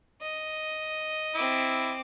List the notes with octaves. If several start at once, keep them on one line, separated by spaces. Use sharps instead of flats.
D#5
C4 E4 D6